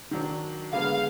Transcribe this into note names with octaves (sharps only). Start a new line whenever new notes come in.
D#3 F#3 D4
D3 G#3 B3 F5